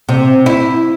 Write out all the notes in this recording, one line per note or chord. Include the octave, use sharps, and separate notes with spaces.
C3
E4